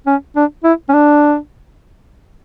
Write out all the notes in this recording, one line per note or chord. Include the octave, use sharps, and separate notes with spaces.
C#4
D4
E4
C#4
D4